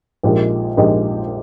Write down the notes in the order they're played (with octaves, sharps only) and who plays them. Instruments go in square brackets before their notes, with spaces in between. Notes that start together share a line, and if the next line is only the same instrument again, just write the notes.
[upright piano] A#1 A#2 G#3 D#4 G4
A#1 A#2 G#3 D#4 G4